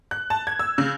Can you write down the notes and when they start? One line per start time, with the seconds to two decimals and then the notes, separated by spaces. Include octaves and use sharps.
0.11 F#6
0.30 A5
0.47 G#6
0.59 E6
0.78 C#3